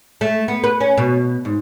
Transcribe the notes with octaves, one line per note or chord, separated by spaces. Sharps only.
A3
B3
B4
C#4
B2
G#2